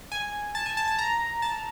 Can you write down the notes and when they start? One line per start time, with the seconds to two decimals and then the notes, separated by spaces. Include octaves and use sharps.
0.12 G#5
0.55 A5
0.66 G#5
0.77 A5
0.88 A5
0.98 A#5
1.42 A5